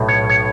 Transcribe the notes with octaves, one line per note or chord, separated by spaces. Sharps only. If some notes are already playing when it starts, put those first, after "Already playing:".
Already playing: B1 A2
C#5
C#5